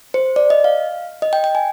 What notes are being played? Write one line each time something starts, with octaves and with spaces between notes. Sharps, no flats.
C5
D5
D#5
F5
D#5
G5
G5
G#5